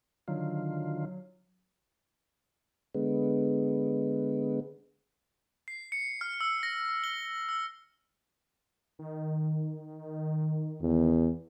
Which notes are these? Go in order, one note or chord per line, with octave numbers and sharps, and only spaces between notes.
D3 D#3 F#3 F4
D3 G#3 B3
C7
C#7
F6
E6
A#6
G7
E6
D#3
E2